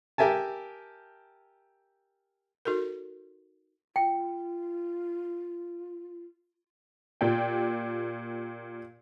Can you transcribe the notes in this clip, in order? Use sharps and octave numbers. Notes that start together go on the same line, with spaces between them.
G4 A#4 E5 G#5 A5
D#4 F#4 A4 A#4
F4 G5
A#2 G4 D5 G5